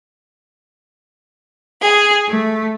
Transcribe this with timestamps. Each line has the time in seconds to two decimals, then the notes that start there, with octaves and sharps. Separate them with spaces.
1.82 G#4
2.27 A3